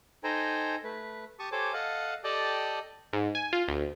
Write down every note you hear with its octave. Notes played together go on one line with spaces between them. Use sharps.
D#4 A4 C5 G5 G#5 A#5
A3 B4
G4 A5 C#6 D#6
G4 A4 C5 C#5 G#5 D6
A4 D#5 F5 F#5 A5
G4 A4 D5 D#5 G5 A5
G#2
G#5
F4
D2